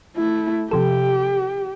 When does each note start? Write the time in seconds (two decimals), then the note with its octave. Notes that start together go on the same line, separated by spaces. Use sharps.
0.16 A3 E4
0.71 C3 F3 G4 A4